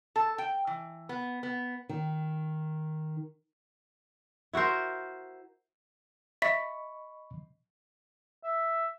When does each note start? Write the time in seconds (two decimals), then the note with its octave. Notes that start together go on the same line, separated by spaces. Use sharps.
0.16 A4
0.38 G5
0.67 E3
1.09 B3
1.43 B3
1.89 D#3
4.53 E4 F#4 A#4 C5
6.42 D#5 E5 B5 C#6 B6
8.43 E5